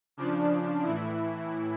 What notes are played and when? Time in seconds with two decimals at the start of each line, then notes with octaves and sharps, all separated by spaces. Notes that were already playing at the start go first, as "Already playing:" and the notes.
0.17 C#3 F3 D4
0.83 A2 E3 E4